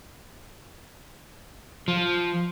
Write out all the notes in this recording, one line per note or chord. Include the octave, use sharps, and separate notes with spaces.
F3